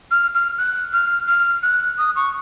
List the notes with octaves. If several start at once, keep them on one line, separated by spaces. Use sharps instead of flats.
F6
F6
F#6
F6
F6
F#6
D#6
C#6